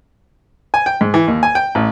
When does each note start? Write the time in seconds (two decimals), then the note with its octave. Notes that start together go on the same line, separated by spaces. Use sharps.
0.74 G#5
0.86 G5
1.01 G#2
1.14 E3
1.28 D#2
1.43 G#5
1.55 G5
1.75 A1